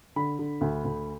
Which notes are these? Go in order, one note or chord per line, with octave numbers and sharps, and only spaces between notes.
D3 B5
D3
D2
D2